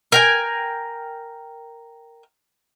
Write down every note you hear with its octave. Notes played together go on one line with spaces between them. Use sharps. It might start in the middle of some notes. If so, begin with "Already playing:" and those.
A#4 G5 G#5